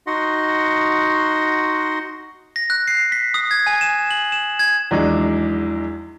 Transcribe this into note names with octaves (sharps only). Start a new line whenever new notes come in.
D#4 F#4 D#5 F#5 C6
A#6
F#6
C7
B6
D#6
G#6
G#5
E7
F#7
E7
G#6
E2 G#2 F3 F#3 G#3 D4